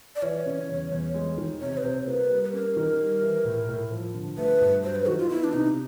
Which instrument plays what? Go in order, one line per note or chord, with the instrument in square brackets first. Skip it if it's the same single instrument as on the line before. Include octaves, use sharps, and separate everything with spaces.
[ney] D5
[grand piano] E3 [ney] C#5
[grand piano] C#3
E2
E2
G#3
D#3
[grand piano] C3 [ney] C#5
[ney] B4
[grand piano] C3 [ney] C5
[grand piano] A#3 [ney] B4
[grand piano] G3
[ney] B4
[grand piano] C#4 [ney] A#4
[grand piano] D#3
G3
E3
A2
A2
F3
D3
[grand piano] A3 [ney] B4
[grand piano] G2
[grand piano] F#3 [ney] C5
[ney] B4
[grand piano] D#3 [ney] F#4
[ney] F4
[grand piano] B3 [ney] E4
[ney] D4
[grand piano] C3 [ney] D#4